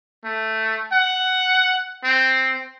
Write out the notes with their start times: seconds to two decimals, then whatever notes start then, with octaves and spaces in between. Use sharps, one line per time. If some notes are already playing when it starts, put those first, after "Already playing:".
0.24 A3
0.92 F#5
2.04 C4